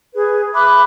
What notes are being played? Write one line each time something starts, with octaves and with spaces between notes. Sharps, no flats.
G#4 B4
E5 B5 D6 F#6